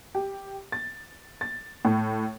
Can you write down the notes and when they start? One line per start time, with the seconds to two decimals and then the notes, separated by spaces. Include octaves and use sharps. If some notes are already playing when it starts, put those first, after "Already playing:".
0.15 G4
0.72 A6
1.41 A6
1.85 A2